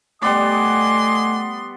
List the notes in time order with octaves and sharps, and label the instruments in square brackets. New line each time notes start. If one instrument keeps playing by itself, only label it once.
[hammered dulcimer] G3 B3 D5 [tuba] A3 [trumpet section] D#5 G#5 D6 [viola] C6